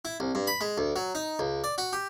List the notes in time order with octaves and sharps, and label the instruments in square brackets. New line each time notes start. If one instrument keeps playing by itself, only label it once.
[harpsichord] E4
C2
G2
B5
G#3
D2
F#3
D#4
C#2
D5
F#4
G4